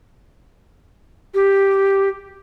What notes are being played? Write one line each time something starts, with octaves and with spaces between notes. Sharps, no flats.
G4